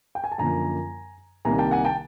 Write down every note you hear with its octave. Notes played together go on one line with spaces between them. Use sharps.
G5
G#5
A5
F#2 D3 F3 A#3 G#5 A#5
C2 C3 D#3 G3 A#3 G#5 A#5
G5 A5
F#5 G#5
G5 A5